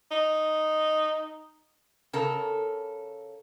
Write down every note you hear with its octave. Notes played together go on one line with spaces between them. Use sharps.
D#4
C#3 A4 A#4